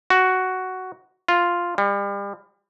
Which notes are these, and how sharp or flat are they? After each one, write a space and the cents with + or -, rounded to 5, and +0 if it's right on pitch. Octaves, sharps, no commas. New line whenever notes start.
F#4 +5
F4 +0
G3 +35